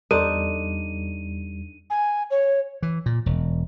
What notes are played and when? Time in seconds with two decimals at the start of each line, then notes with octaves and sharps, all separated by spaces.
0.11 E2 G3 D4 D#4 A4 C5 D#7
1.90 G#5
2.30 C#5
2.83 E3
3.06 A#2
3.26 E1